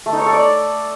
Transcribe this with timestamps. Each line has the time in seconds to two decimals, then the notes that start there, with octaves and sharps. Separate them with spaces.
0.06 A3
0.13 D#4
0.19 C#5
0.26 A4
0.33 D5